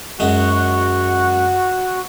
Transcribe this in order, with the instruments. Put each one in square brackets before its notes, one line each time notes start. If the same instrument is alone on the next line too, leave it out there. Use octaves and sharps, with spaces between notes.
[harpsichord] F#2 G#3 [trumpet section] F#4